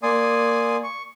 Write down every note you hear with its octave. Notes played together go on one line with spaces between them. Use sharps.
A#3 D5 G#5 C6 D#6
C#6